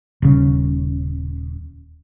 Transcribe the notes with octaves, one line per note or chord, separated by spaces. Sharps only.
D#1 C#3